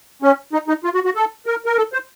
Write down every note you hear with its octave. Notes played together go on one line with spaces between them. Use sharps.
C#4
D#4
D#4
F4
F#4
F#4
A4
A#4
A#4
A4
C5